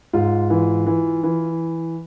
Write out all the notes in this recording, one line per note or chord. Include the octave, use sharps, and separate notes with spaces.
G#2 F4
E3
E3
E3